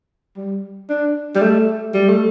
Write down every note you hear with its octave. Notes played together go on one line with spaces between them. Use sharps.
G3
D4
G3
A3
G3
A3